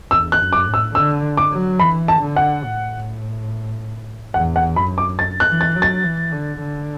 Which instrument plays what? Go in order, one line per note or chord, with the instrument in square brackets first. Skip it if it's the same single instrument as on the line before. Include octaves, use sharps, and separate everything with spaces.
[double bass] E2 [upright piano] E6
[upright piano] F#6
[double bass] F#2
[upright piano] D6
[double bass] A2
[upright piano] E6
[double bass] D3 [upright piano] E6
[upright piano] D6
[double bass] F#3
[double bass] E3 [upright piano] B5
[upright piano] A5
[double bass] D3
[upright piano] F#5
[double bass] A2
[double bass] E2 [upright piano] F#5
[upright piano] F#5
[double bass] F#2 [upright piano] B5
[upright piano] D6
A6
F#6
[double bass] E3
[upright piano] A6
[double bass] F#3
[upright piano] A6
[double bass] E3
D3
D3